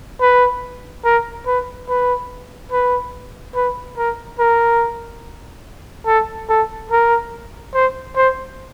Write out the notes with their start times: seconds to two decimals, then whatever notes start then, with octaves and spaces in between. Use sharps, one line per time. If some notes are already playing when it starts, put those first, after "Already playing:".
0.21 B4
1.05 A#4
1.46 B4
1.89 B4
2.72 B4
3.55 B4
3.97 A#4
4.39 A#4
6.06 A4
6.49 A4
6.91 A#4
7.74 C5
8.16 C5